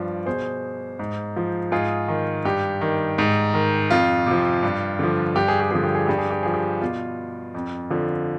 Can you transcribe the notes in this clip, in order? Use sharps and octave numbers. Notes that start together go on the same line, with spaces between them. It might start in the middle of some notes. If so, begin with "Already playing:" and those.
Already playing: G2 F3 D5
B2 G#4 C5
G#2
F3
G#2 F4 G#4
D#3
G2 G4
D#3
G#2
D#3
F2 F4
C3 F3
G2
D3 F3
G2 G4
G#4
G4
D3 F3 G#4
G4
G#4
G2 G4
G#4
G4
F3 G#4
G4
B2 F4
F2
D3 F3